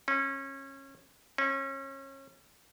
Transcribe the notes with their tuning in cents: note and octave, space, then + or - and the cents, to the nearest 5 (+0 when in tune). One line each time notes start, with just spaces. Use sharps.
C#4 -25
C#4 -30